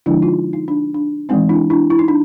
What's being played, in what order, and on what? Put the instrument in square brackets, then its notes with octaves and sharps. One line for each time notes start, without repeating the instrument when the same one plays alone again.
[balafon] D3 F3 G#3 D4 E4
D#4 F4
D#4
D4
D4
E3 G#3 C4 D#4
D4 E4
D4 E4
E4
D#4
D4